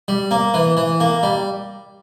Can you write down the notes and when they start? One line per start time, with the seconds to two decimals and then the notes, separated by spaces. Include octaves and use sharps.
0.08 G3
0.31 A#3
0.54 E3
0.77 E3
1.00 A#3
1.23 G3